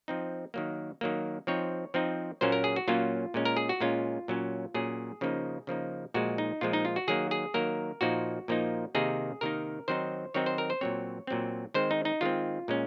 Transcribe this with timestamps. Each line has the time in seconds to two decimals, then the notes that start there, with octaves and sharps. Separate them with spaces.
0.08 F3 C4 D#4
0.54 D#3 F#3 A#3
1.01 D#3 F#3 A#3
1.47 F3 C4 D#4 C#5
1.94 F3 C4 D#4
2.41 A#2 F#3 A#3 C#4 C5
2.52 A#4
2.64 G#4
2.76 F#4
2.88 A#2 F#3 A#3 C#4 F4
3.34 A#2 G#3 C#4
3.45 A#4
3.57 G#4
3.69 F#4
3.81 A#2 G#3 C#4 F4
4.28 A#2 F#3 C#4
4.74 A#2 F#3 C#4 G#4
5.21 C#3 F3 A#3 D#4
5.67 C#3 F3 A#3 D#4
6.14 A#2 F3 G#3 F#4
6.38 D#4
6.61 A#2 F3 G#3 F4
6.73 D#4
6.85 F4
6.96 F#4
7.08 D#3 F#3 A#3 G#4
7.31 G#4
7.54 D#3 F#3 A#3 A#4
8.01 A#2 F3 A#3 D#4 F#4
8.48 A#2 F3 A#3 D#4
8.95 C3 D#3 A#3 D#4 G#4
9.41 C3 D#3 A#3 D#4 A#4
9.88 D#3 F#3 C4 D#4 C5
10.34 D#3 F#3 C4 D#4 C#5
10.46 C5
10.58 A#4
10.70 C5
10.81 A#2 F#3 C4 C#5
11.27 A#2 F#3 C4
11.74 D#3 G#3 C4 C5
11.91 D#4
12.05 D#4
12.21 D#3 G#3 C4 F4
12.68 A#2 G#3 C#4